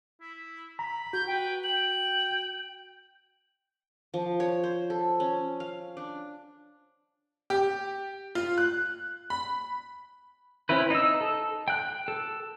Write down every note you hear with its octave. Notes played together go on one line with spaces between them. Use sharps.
E4
A#5 B5
F#4 G6
B4 G5
G5 F#7
F3
C#5
C5
A4
C#4
F5
D4
G4
F4
F#6
B5
C4 C#4 E4 B4
D#4 E6
A4
G5 F#6
A4